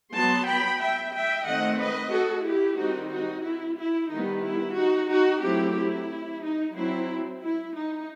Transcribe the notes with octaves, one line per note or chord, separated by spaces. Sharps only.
F#3 B3 A5 C6
G5 B5
E5 G5
E5 G5
D#3 A3 C4 D#5 F#5
B4 D#5
F#4 A4
E4 G4
D#3 G3 C4 D#4 F#4
D#4 F#4
E4
E4
D#3 G3 B3 D#4
E4
D#4 F#4
D#4 F#4
F#3 A3 C4 E4 G4
E4
D#4
F#3 C4 E4
E4
D#4